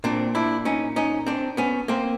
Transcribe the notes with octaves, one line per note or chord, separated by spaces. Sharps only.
A#2 C4 D4
D4 E4
C#4 D#4
C#4 D#4
C4 D4
B3 C#4
A#3 C4